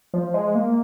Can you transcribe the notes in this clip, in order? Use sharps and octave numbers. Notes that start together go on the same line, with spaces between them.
F3
G#3
A#3